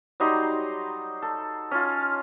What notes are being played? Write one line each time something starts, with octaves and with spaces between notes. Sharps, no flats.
F#3 G3 D#4 C6
A4
C#4 F4